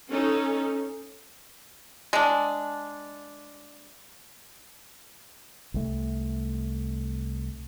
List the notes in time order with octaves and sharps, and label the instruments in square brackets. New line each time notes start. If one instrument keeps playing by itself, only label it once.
[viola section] C#4 D#4 A4
[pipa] G#3 D4
[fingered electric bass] C2 A3